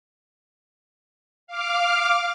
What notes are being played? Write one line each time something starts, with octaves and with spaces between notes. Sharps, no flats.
F5 D6 F6